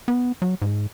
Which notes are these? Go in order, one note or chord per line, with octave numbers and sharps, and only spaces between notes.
B3
F#3
G#2